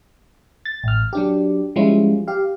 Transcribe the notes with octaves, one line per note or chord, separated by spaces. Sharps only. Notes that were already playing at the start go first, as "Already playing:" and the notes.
A6
A1 F6
F#3 D4 G4
F3 G3 G#3 C#4 E4 F4
G4 F5